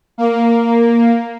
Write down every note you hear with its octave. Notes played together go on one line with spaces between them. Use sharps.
A#3